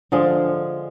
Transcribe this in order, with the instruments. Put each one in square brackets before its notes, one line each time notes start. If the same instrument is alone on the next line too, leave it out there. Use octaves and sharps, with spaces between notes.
[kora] D3 F3 G#3